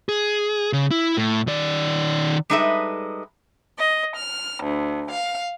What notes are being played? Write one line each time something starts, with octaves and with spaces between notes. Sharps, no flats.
G#4
C#3
E4
A2
D#3 D5
G3 G#3 D#4 A4 B4 E5
D#5
F6
D2
F5